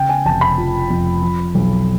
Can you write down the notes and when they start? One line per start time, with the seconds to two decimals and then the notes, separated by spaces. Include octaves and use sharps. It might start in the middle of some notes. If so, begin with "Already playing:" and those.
Already playing: C#3 G5
0.09 G#5
0.25 F1 A5
0.41 B5
0.58 F3
0.90 F2
1.22 F3
1.55 B1